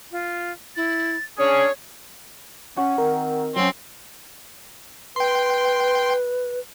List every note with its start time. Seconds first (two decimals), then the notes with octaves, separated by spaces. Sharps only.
0.12 F4
0.76 E4 A6
1.39 C#4 D4 G#4 C#5
2.77 C#4 F#4
2.98 D#3 C4 A#4
3.56 F#3 C4 C#4
5.16 B4 G5 C6